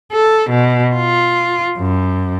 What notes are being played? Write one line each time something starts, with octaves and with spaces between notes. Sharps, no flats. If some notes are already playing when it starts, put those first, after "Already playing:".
A4
B2
F4
F#2